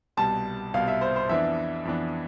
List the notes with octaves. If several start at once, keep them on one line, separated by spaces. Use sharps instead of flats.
C2 B2 G3 A5
C2 B2 G3 F5
E5
C5
C5
F2 E3 B3 D4 E5
F2 E3 B3 D4